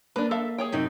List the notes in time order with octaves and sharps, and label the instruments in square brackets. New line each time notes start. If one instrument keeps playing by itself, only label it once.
[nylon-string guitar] A#3 [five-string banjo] D4 B4
[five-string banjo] A4 E5 F5
G#4 C#5 G5
[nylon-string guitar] F#2 C3 D#4